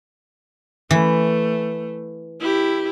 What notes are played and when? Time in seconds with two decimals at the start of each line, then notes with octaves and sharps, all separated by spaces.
0.91 E3 A3
2.40 E4 G4